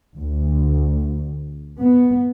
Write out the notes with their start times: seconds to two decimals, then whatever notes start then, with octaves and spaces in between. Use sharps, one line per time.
0.16 D2
1.79 B3